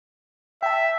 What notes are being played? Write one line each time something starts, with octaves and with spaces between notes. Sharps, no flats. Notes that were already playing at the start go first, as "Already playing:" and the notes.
E5 G5 A5